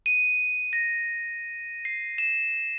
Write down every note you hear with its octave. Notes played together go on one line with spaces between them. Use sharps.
D#7
A#6
C7
E7